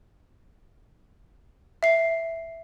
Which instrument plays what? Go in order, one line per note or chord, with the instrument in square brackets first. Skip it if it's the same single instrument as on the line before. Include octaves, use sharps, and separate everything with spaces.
[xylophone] E5 C7